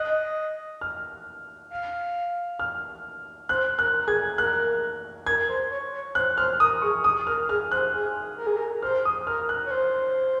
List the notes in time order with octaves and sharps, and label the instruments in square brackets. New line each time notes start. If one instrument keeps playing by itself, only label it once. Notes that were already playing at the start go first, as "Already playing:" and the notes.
Already playing: [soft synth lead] D#5 [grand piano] F#6
[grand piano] F6
[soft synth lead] F5
[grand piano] F6
[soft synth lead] C5 [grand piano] F#6
[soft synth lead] A#4 [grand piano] F#6
[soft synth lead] A#4
[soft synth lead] G#4 [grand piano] G#6
[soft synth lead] A#4 [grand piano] F#6
[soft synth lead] A#4 [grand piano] G#6
[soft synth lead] C5
C#5
C#5
[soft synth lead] C5 [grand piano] F#6
[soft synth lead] C5 [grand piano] F6
[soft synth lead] A#4 [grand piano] D#6
[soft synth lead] G#4 [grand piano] C#6
[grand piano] D#6
[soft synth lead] A#4 [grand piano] F6
[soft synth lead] G#4 [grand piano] F6
[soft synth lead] C5 [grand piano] F#6
[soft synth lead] G#4
A#4
G#4
A#4
[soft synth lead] C5 [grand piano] F6
[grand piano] D#6
[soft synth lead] A#4 [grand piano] F6
[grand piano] F#6
[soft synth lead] C#5
C5